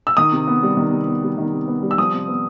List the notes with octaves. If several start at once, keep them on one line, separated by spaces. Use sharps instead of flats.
E6
D#3 D#6
C3
B3
G3
D#3
C3
B3
G3
D#3
C3
B3
G3
E6
F3 D#6
C3
B3